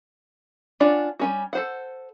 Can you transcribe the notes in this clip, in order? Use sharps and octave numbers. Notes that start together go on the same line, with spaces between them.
C#4 D4 F4 D5 F#5
G3 C#4 F#4
A4 C5 F#5